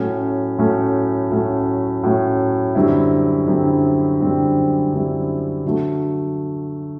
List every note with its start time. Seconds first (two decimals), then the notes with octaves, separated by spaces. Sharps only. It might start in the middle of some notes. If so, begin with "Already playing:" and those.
Already playing: A2 F#3 A3 C#4
0.58 A2 F#3 A3 C#4
1.30 A2 F#3 A3 C#4
2.03 A2 F#3 A3 C#4
2.75 F#2 D3 G3 C4 E4
3.47 F#2 D3 G3 C4 E4
4.19 F#2 D3 G3 C4 E4
4.92 F#2 D3 G3 C4 E4
5.66 D3 F#3 A3